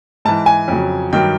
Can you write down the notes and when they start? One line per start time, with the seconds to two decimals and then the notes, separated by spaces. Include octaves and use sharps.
0.25 G#2 E3 A5
0.46 G#5
0.68 F2 C#3 F#3
1.13 G2 D#3 F#3 G5